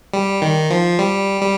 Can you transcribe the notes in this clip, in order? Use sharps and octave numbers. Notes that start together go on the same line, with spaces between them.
G3
D#3
F3
G3
G3